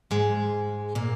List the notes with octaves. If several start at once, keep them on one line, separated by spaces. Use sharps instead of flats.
G#2 G#3
A#2 A#3